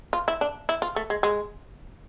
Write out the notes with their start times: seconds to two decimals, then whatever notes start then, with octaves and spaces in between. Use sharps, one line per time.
0.13 F4
0.28 E4
0.41 D4
0.69 E4
0.82 F4
0.96 A3
1.10 G#3
1.23 G#3